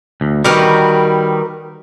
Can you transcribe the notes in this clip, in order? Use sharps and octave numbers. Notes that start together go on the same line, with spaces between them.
D2
D#3 G3 F#4 A#4 B4